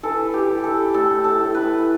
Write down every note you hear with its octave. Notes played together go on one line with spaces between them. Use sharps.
E3 A4
G4
E3
A4
A2 A4
A4
A2
B4